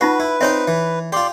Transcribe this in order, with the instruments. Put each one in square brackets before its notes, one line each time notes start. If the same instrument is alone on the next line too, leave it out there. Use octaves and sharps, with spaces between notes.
[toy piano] D#4 F4 F#5 [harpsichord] F#4 [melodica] B4
[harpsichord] E4
[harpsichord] C4 D#4 C5 [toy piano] C#5 E5
[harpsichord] E3
[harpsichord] F4 G4 [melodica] D5 C6